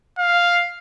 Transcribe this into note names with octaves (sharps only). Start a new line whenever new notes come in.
F5